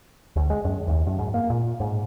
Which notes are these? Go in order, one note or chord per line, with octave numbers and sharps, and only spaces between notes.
D2
G#3
F#2
D#2
F#2
G#2
A#3
A#2
G#2